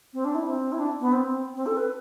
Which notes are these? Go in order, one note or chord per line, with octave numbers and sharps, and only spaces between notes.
C4
D4
E4
C4
E4
D4
B3
C4
C4
A4
B4